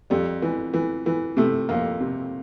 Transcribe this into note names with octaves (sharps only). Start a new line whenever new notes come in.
F2 G3
E3
E3
E3
C3 A3
F2 A#3
C3